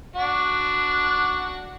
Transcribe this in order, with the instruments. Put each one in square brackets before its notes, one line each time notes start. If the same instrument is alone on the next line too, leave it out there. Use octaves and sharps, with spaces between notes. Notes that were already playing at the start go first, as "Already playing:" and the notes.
[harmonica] D4 F#4